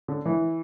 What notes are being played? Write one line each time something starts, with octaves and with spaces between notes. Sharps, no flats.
D3
E3